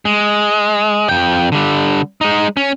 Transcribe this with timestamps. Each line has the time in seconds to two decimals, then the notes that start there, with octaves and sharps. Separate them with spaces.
0.05 G#3
1.09 F2 G5
1.52 D3 G3
2.21 G#3 D#4
2.57 C#4